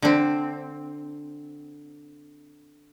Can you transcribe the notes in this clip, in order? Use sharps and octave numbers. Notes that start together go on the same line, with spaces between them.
D3 C4